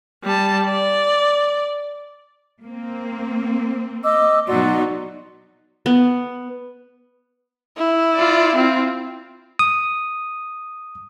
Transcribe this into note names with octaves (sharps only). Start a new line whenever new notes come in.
G3 A5
D5
A#3 C4
D#5 D6 E6
B2 F#3 D#4 F#4 D5 C6
B3
E4
F4 D5
C4 F4
D#6